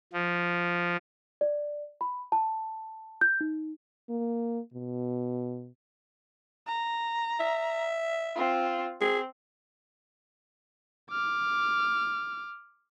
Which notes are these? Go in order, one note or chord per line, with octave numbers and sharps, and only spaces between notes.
F3
D5
B5
A5
G6
D#4
A#3
B2
A#5
E5
C4 F4
C4 G#4
D6 F6